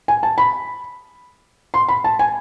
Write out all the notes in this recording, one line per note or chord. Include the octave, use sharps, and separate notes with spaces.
G#5
A5
B5
C6
B5
A5
G#5